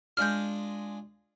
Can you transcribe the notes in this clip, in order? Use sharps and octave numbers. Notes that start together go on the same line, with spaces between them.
G#3 D4 F4 F6 G6